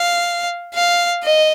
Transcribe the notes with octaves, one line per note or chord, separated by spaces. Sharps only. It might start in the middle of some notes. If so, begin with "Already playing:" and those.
Already playing: F5
F5
D#5